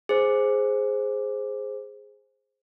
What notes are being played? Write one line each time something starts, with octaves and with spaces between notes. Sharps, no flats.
G#4 C5